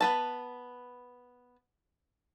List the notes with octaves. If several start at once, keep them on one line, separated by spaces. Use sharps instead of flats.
B3 B4 A5